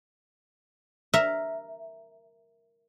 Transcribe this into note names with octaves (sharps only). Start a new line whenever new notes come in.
A#4 E5